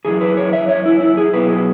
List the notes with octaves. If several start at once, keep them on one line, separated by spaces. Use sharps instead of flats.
F#2 C#3 E3 G#4
B4
C#5
E5
C#5
E4
E4
G#4
B2 F#3 B3 B4
G#4